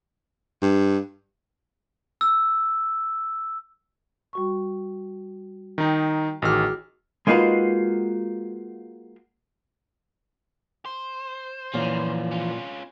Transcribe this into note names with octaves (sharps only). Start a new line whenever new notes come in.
G2
E6
G3 F#4 C#6
D#3 D#4 G5
A1 D#3 F#4 G#4 D6 F6
G#3 A#3 D#4 F4 F#4 B4
C5
F#2 A#2 E3 F3
C#4 F4